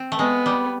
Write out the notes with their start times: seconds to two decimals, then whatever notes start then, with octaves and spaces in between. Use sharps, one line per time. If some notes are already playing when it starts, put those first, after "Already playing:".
Already playing: C4
0.12 A3
0.19 G#3 B3
0.46 G3